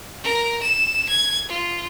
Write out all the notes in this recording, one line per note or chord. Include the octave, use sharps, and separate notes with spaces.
A#4
E7
G#6
F4